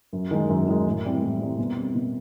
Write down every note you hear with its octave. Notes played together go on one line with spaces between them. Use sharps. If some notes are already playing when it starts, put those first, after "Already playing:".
F#2
D#3 G#3
F#2
D#3 G#3
A2
E3 G3 C4
A2
E3 G3 C4
B2
G3 C4
B2